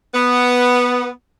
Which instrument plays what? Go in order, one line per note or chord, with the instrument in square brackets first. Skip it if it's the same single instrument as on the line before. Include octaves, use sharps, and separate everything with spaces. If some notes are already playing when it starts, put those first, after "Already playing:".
[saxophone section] B3